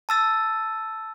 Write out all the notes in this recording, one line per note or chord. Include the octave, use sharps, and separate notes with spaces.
A5 E6 A6